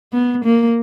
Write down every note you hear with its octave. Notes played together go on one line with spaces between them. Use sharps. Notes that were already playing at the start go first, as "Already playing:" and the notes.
B3
A#3